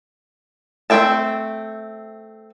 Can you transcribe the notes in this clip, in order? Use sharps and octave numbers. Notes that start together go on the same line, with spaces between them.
A3 C4 E5 G5 A5